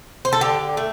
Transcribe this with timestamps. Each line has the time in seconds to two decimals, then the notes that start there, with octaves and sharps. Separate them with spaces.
0.25 C5
0.33 A4
0.41 D3 G4
0.77 A3